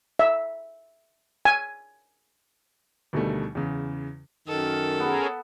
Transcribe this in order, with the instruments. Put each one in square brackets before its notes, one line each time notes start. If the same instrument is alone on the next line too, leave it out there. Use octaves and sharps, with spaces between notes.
[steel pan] E5
G#5
[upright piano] D2 B2 D#3 G3 A3
E2 C#3
[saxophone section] F#2 D#3 [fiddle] A4
[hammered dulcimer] B3 [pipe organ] C#4 G#4 A#4